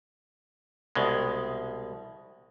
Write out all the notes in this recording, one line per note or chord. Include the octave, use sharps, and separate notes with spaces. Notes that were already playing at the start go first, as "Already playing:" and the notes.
C2 B2 G#3